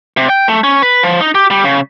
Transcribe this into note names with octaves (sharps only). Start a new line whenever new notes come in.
C3
G5
A3
C#4
B4
F3
D#4
G4
G3
C#3